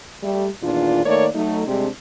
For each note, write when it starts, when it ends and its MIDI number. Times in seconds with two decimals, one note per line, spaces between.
0.23 0.47 55
0.23 0.47 57
0.62 1.05 40
0.62 1.05 46
0.62 1.05 51
0.62 1.05 62
0.62 1.05 65
1.05 1.26 51
1.05 1.26 57
1.05 1.26 58
1.05 1.26 70
1.05 1.26 73
1.05 1.26 74
1.35 1.66 54
1.35 1.66 57
1.35 1.66 63
1.67 1.87 48
1.67 1.87 55
1.67 1.87 56
1.67 1.87 60
1.67 1.87 62